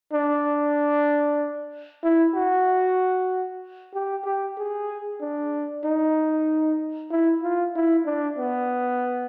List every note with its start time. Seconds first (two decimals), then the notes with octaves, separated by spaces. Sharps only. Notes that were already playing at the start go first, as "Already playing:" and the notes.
0.13 D4
2.03 E4
2.34 F#4
3.94 G4
4.25 G4
4.58 G#4
5.21 D4
5.84 D#4
7.10 E4
7.42 F4
7.75 E4
8.06 D4
8.38 B3